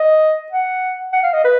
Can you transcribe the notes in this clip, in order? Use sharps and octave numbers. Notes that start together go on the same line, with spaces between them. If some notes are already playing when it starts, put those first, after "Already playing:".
Already playing: D#5
F#5
F#5
F5
D#5
B4